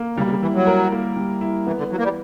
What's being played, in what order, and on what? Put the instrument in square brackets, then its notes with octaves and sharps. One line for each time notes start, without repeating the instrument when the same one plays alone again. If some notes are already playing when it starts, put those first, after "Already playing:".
Already playing: [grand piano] A#3 A#4
[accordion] C#3 [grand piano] G3
[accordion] B2
C#3
[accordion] E3 [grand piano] E4
[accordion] F#3
[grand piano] A#4
A#3
G3
E4
[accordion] E3 [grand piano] B3
[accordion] D3
[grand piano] E3 [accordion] F#3
[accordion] A#3
G3